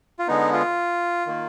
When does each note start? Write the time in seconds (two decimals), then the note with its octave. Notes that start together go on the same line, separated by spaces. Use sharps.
0.19 F4
0.28 D3 G#3 B3 D#4
0.53 F4
1.26 D#3 A#3